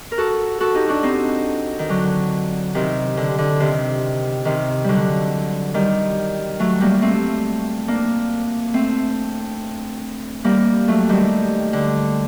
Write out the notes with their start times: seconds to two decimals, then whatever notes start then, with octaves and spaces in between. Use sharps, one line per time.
0.12 A#4
0.18 F#4 A4
0.61 F#4 A4
0.75 D#4 G4
0.89 D4 F#4
1.03 C4 D#4
1.79 D#3
1.89 D3 F#3
2.75 C3 D#3
3.17 D3
3.38 D3
3.60 C3 D#3
4.45 C3 D#3
4.84 D3 F#3 G3
5.74 D#3 G3
6.60 F#3 A3
6.81 G3 A#3
7.02 A3 C4
7.88 A#3 D4
8.74 A3 C4
10.44 G3 A#3
10.88 F#3 A3
11.09 D#3 G3
11.73 D3